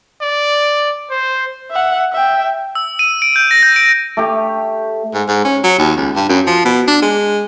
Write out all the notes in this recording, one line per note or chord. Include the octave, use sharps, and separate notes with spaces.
D5
C5
E5 F#5
E5 G5
E6
D#7
D7
G6
A#6
G6
D7
A3 G4
G#2
G#2
C#4
F#3
D#2
C#2
G2
F#2
F3
B2
D4
G#3